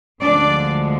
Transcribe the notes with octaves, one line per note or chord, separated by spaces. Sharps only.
D2 D3 F3 G#3 D4 D5